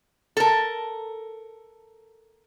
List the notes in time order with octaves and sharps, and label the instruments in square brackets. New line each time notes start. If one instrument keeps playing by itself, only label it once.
[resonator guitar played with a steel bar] A4 A#4